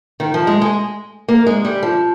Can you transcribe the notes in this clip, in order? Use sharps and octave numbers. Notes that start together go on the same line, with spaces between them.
D#3
F3
G#3
G#3
A#3
G#3
G3
F3